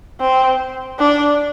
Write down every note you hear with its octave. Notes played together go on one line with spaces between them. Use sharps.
C4
D4